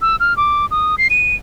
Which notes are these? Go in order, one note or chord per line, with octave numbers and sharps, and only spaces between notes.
E6
F6
D6
D#6
C7
D#7